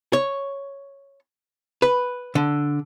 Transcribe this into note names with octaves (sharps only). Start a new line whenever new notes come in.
C#5
B4
D3